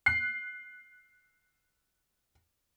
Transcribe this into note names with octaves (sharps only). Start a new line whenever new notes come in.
F#6 C7